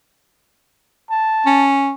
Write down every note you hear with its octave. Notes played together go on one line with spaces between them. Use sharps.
A5
C#4